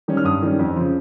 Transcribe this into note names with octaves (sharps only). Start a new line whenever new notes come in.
D#3 G3 C#4
F6
G2 D#6
D#3 G3 C#4
F2
C#3 F3